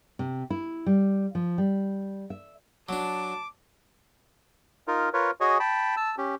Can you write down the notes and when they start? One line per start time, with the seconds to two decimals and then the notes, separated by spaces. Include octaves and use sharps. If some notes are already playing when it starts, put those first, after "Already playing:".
0.19 C3
0.50 E4
0.86 G3
1.35 F3
1.58 G3
2.30 E5
2.89 F#3 D4 A5 D6
4.88 D#4 F4 A#4
5.13 F4 A#4 B4 C#5
5.41 F#4 G#4 C#5 D#5 G#5
5.60 G5 A5 B5
5.97 A5 E6
6.18 C#4 G4